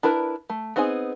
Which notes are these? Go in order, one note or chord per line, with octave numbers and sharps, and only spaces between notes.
D4 E4 A#4 B4
A3
B3 C4 D#4 G#4 G#5